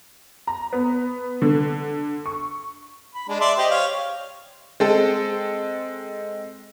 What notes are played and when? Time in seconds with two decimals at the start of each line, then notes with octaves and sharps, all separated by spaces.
0.47 A#5
0.73 B3
1.42 D3
2.26 C#6
3.15 B5
3.29 G#3 D4
3.41 D5 E5 C6
3.58 G4 C5 D#5
3.71 C#5 F5
4.80 G#3 C4 A4